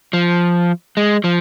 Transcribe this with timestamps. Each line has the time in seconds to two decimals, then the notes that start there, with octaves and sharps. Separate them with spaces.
0.13 F3
0.97 G#3
1.24 F3